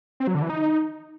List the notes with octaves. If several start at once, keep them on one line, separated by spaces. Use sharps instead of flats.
C4
F#3
D3
E3
D#4